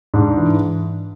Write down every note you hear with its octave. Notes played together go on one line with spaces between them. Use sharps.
G#2 D4
E3